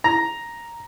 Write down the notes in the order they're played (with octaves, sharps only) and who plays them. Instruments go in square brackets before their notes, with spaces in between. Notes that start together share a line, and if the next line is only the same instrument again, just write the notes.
[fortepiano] A#5